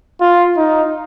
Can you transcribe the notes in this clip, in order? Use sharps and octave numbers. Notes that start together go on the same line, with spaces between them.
F4
D#4